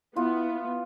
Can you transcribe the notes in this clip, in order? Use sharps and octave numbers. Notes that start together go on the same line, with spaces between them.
B3 E4 F4